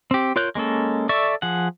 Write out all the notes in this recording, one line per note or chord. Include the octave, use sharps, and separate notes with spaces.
C4 G4
F4 A#4 C#5 F#6 G6
G#3 A#3 C#4 A4
A4 D5 E5 C#6
F3 G#4 F#5